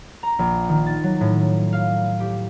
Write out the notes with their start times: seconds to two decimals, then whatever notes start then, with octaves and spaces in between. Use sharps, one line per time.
0.23 A#5
0.39 A#1
0.69 D#3
0.86 A6
1.03 F#3
1.21 A2
1.73 F5
2.20 G4